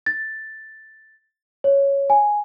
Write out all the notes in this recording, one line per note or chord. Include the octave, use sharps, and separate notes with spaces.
A6
C#5
G#5